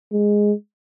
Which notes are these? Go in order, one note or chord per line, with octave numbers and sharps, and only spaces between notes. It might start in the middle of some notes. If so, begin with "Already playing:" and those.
G#3